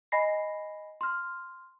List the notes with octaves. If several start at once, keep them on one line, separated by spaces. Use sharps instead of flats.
D#5 G#5 B5 A#6 C7
C6 F6